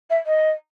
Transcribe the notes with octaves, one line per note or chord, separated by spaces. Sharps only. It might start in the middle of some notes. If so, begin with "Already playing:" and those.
E5
D#5